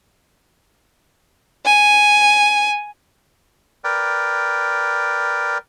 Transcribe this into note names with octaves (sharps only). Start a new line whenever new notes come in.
G#5
A#4 B4 D5 G5